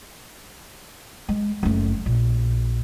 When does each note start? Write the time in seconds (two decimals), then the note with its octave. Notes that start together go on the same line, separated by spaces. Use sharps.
1.29 G#3
1.63 F#1 A3
2.06 A#1